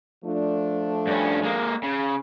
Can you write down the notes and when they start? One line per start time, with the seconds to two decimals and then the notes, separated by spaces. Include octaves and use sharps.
0.25 F3 A3 D4
1.07 G2 C#4
1.44 G#3 A#3
1.84 C#3